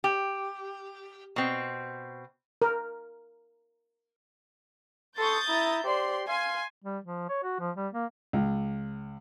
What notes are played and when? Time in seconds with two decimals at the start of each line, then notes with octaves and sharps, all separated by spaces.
0.04 G4
1.36 B2 C4
2.62 A#4
5.18 A4 C6 C#6 D#6 G6 A6
5.48 E4 E5 A#5
5.84 G4 C5 D5 C6
6.28 F5 G#5 C6
6.84 G3
7.05 F3
7.29 C#5
7.43 F#4
7.60 F3
7.77 G3
7.93 A#3
8.33 C#2